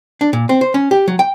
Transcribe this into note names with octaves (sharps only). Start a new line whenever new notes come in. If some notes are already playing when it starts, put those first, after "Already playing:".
D4
A#2
C4
C5
C#4
G4
F#3
G5